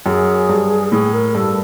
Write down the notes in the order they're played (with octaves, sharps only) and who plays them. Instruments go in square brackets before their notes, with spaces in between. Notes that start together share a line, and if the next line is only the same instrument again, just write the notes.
[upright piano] F#2 [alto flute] G#4
[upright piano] G2
[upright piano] A2 [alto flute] G#4
[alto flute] A#4
[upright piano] G2 [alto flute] A4